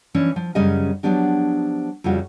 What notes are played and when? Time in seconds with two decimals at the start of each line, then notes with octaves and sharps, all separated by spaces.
0.14 E3 F3 C#4 D4
0.36 F3
0.55 F#2 C#3 G3 C#4 D#5 G#5
1.03 F3 F#3 B3 D4 G4
2.04 F2 C#3 G3 F4 F#4